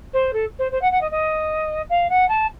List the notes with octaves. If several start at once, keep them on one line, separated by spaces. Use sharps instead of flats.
C5
A4
C5
C5
F#5
F#5
D#5
D#5
F5
F#5
A5